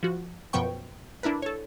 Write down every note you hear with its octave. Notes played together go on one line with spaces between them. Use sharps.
F3 F#4
F#2 B2 F3 B3 G5 C#6
D4 E4 A#4 B4
A4 C#5